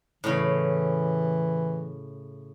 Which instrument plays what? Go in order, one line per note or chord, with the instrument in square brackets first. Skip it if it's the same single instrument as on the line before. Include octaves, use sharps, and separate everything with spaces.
[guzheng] A2 C#3 [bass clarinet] E3